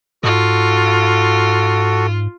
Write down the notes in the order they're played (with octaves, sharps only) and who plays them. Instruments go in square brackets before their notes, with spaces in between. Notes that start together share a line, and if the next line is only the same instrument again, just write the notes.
[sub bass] G#2 [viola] F4 [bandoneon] F#4 A4